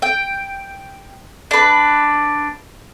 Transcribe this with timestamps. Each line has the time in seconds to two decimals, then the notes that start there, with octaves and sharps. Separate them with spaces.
0.02 G5
1.51 D4 B4